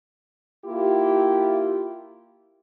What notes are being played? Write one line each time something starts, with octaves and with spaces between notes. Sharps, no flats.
A#3 E4 F4 G4